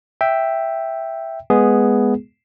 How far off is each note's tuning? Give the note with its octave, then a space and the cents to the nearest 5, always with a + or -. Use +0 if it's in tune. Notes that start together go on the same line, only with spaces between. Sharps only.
E5 +0 G5 +0
G#3 +0 B3 +0 G#4 +0